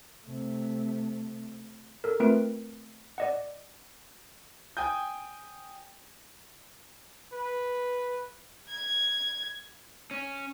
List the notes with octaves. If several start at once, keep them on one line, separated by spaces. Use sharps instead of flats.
C3 A3
A4 A#4
A3 C4 F4 A#4 B4 D7
D5 D#5 F#5
G5 G#5 D#6 G6
B4
G#6
C#4